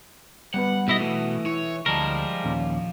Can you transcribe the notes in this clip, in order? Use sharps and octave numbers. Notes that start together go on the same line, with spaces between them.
G3 B3 B4 F#5
B1 B2 E4 D#5
E3 A3
E4 C#5
D2 F3 G3 G#3 A#4 A5
D#2 A#2 C#4